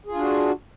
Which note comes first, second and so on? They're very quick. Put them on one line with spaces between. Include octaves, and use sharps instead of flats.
G#4 F4 D4 F#4